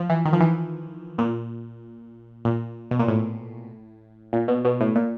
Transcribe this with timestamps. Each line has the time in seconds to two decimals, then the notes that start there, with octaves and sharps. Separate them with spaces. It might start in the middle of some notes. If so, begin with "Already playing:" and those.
Already playing: F3
0.10 E3
0.25 D#3
0.33 F3
0.40 E3
1.18 A#2
2.45 A#2
2.91 B2
2.99 A#2
3.08 A2
4.33 A#2
4.48 B2
4.65 B2
4.81 A2
4.96 A#2